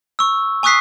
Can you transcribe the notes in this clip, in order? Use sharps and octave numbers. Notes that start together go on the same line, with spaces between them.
C#6 E6
G#5 C#6 D#6 F#6 B6 C7